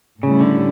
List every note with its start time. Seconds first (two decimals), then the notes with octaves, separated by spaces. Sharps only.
0.23 A2 C#3 G3 C#4 E4
0.41 D3